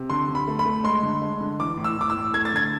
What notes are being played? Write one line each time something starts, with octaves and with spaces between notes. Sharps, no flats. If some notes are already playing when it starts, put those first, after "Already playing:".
Already playing: C3
D3 C6
D3
B5
A3
B5
A3
G#3 C6
D3
G#3
D3
E3 D6
A2
E6
A2 D6
E6
A2
A3 G#6
A6
D3 G#6